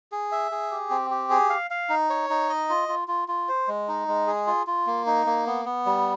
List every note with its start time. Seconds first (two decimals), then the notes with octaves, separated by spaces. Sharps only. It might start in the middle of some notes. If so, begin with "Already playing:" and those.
0.12 G#4
0.32 E5
0.51 G#4
0.71 G4
0.90 C4
1.11 G4
1.30 G#4
1.50 F5
1.71 F5
1.89 D#4
2.10 C#5
2.30 D#4
2.49 D#5
2.70 F4
2.88 F4
3.08 F4
3.28 F4
3.48 C5
3.68 G#3
3.88 D#4
4.08 G#3
4.27 G#4
4.47 F4
4.67 F4
4.87 A#3
5.06 D#4
5.26 A#3
5.46 B3
5.66 B3
5.86 G3